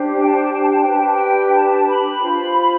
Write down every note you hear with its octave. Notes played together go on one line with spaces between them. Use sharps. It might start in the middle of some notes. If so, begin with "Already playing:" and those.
Already playing: D4 G4 C5
G5
A5
G5
A5
G5
A5
G5
A5
G5
D4 G4 B4 A5
G5
A5
G5
A5
A5
B5
F4 C5